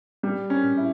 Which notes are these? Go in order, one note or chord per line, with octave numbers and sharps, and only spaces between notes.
G3
C#4
E4